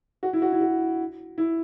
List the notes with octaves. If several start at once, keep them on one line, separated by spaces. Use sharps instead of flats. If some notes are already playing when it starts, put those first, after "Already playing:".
F#4
E4
F#4
E4
F#4
E4